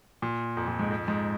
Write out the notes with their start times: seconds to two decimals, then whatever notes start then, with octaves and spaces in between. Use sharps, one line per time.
0.22 A#2
0.57 F2
0.68 A#2
0.79 G#2
0.91 F2
1.08 G#2